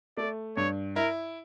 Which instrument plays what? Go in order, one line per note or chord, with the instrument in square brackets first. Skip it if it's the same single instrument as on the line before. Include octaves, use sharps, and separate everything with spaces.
[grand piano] A3 [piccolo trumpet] D5
[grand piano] G2 [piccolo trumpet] C#5
[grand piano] E4 [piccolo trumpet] A#4